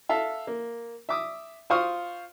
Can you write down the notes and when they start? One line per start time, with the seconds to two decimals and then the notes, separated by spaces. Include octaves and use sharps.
0.09 A4 E5 F5
0.47 A#3
1.09 E5 D6 D#6
1.70 F4 C5 F5 C#6 D#6 F6